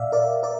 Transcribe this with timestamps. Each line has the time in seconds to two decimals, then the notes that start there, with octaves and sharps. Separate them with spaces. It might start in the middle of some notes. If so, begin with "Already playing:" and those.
Already playing: A#2 D5 E5 F5
0.12 A#4 D5
0.43 A#4 D5